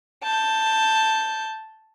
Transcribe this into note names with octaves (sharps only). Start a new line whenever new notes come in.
A5 G6